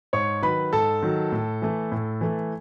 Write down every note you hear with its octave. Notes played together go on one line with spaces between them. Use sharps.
G#2 C#5 C#6
D#3 F#3 B4 B5
G#2 A4 A5
D#3 F#3
A2
E3 A3
A2
E3 A3